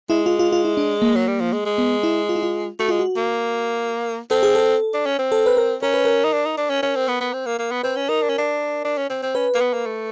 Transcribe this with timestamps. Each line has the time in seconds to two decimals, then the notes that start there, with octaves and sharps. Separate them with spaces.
0.10 G#3 E4
0.26 F4
0.39 F4
0.52 F4
0.65 E4
0.77 D4
1.02 A#3
1.16 F#3
1.27 G3
1.40 F3
1.53 G#3
1.66 G#3
1.78 B3
2.03 E4
2.29 F4
2.36 E4
2.43 F4
2.79 A3 F#4
2.88 G#3 F4
2.99 F#4
3.17 A#3
4.31 C4 A4
4.43 G#4
4.55 A4
4.94 D4
5.06 C#4
5.19 C4
5.32 A4
5.46 B4
5.57 A#4
5.82 C#4 A#4
5.94 B4
6.05 A#4
6.24 D#4
6.33 D4
6.45 D#4
6.57 D4
6.70 C#4
6.83 C#4
6.96 C4
7.08 B3
7.21 B3
7.33 C4
7.46 A#3
7.59 A#3
7.71 B3
7.83 C4 B4
7.96 C#4
8.09 D#4 A#4
8.22 D4
8.30 C#4
8.38 D4
8.85 D4
8.98 C#4
9.10 C4
9.23 C4
9.35 C#4 B4
9.55 A#3
9.61 B3
9.74 A#3
9.86 A3